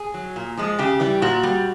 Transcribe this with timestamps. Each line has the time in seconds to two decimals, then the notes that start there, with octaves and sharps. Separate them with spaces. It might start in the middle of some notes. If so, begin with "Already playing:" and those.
Already playing: G#4
0.14 F#3
0.36 A#2
0.57 F3 G#3
0.79 C#3 G4
1.00 E3 G3
1.22 A#2 F#4
1.43 G3